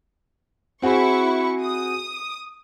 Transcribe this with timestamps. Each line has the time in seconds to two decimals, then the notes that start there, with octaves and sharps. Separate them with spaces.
0.82 C4 E4 F#4 G#4 C#6
1.61 D#6